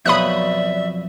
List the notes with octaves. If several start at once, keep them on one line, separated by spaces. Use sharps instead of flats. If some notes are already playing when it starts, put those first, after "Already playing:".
F2 B2 F#3 D5 E5 B5 D#6 F#6